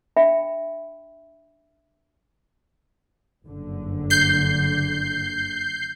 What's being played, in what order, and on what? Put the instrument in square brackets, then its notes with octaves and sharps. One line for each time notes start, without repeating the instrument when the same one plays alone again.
[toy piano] D4 E5 G5 B5
[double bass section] F#1 G2 D3
[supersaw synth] G6 C7